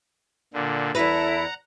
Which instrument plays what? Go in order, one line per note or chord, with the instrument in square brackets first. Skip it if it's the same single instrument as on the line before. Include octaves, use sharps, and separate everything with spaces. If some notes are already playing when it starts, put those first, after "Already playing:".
[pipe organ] A#2 D3
[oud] E2 B4 [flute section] E4 A4 [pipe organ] F#5 A#5